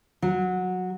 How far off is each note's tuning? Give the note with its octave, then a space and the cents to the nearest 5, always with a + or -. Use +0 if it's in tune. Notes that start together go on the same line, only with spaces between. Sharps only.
F#3 -15